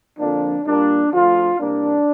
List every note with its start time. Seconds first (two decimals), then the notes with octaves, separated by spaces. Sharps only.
0.19 F2 D3 F3 A#3 D4
0.65 A#2 G3 A#3 D4
1.12 D2 D3 F3 F4
1.59 C2 C3 A#3 D4